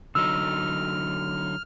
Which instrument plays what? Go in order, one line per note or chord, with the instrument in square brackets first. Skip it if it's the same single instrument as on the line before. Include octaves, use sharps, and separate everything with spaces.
[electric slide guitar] D3 F#3 D#4 [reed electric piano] E6 [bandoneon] F6